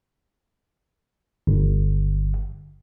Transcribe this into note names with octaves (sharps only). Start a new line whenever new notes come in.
G1